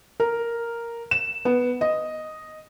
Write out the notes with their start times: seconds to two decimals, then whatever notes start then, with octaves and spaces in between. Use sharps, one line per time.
0.20 A#4
1.11 E7
1.45 B3
1.81 D#5